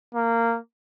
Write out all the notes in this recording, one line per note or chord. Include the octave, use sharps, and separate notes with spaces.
A#3